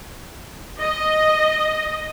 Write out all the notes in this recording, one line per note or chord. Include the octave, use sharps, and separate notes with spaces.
D#5